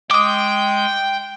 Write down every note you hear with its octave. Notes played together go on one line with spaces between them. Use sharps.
G#3 G5 D6 D#6